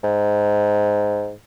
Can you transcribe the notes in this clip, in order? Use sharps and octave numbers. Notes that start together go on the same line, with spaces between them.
G#2